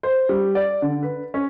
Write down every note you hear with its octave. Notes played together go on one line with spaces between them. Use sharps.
C5
G3
D5
D3
B4
C#4